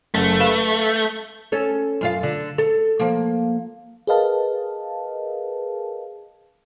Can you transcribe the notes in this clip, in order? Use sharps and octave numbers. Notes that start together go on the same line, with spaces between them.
F#1 A3
B4 F5 E7
C#4 A4
F#2 F4 F5
D3
A4
F3 A#3
G#4 A#4 B4 D#5 F5 A5